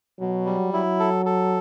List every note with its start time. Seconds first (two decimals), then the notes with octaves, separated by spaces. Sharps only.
0.20 B2 F#3
0.45 G3
0.73 F#3 E4
1.00 A4
1.26 A4